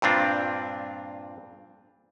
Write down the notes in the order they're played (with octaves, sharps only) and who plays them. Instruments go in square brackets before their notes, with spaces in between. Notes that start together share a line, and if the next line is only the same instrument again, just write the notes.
[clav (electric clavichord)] G2 A#2 C4 D4 F4